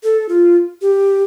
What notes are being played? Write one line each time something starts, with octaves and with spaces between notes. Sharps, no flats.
A4
F4
G4